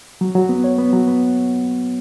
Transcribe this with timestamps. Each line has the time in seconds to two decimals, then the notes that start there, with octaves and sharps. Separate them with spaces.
0.21 F#3
0.35 F#3
0.49 B3
0.64 C#5
0.78 B3
0.93 F#3
1.07 B3